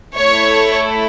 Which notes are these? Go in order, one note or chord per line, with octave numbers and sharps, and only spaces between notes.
A3 E4 A4 C#5